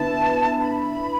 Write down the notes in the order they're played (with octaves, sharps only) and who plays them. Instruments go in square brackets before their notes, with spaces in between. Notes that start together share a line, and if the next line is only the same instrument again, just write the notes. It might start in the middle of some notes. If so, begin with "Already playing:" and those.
Already playing: [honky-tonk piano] D3 B3 E4 B4 [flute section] A5
[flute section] B5